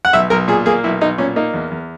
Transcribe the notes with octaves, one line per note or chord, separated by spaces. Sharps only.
F#5
B1 E5
B1 A#4
A#2 G#4
A#3 G#4
B1 E4
B1 D#4
A#2 C#4
A#3 D#4
E2
E2